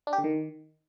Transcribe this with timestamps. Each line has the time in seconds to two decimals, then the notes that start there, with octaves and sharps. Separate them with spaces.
0.07 D4
0.13 G4
0.18 D3
0.24 D#3